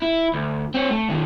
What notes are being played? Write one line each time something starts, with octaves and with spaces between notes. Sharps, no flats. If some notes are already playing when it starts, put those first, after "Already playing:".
E4
D2
C4 C#5
A3
B2 D#3